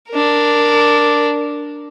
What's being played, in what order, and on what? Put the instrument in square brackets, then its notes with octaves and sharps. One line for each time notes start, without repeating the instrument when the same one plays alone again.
[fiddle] D4 A#4